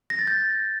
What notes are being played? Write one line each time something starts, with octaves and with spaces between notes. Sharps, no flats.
A#6
A6
G6